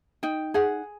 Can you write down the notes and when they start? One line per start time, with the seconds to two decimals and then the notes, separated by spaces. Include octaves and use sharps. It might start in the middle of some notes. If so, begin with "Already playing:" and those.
0.23 D#4 G5
0.54 G#4 F#5